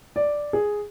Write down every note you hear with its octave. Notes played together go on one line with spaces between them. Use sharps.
D5
G#4